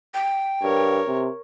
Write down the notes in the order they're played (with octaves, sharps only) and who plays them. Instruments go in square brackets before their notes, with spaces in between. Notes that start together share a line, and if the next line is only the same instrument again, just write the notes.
[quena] G5
[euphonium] G2 [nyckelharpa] A#4 C#5
[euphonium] C3